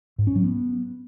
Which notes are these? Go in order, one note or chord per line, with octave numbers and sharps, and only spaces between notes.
G#2
C#4
F#3
B3